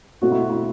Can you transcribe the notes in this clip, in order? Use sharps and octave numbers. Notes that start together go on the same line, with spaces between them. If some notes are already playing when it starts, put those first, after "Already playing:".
B2 A3 C4 F#4
E4
E4